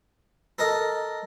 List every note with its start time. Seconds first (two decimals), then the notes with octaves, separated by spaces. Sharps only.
0.59 A4 A#4 D#5